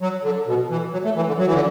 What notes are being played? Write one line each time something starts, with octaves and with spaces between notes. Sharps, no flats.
F#3
D3
B2
E3
F#3
A3
E3
D3
F#3
E3
D3